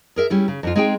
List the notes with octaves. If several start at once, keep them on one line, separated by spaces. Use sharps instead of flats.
G#4 A#4 E5
G3 C#4 E4
C#3
F2 F3 F4
G#3 C4 D#4 G#4 G5